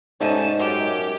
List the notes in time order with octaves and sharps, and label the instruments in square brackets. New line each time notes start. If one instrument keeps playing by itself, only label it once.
[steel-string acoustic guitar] G#2 D#4 [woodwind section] G3 A3 C#4 [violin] A5 D#7
[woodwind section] F#2 [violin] G4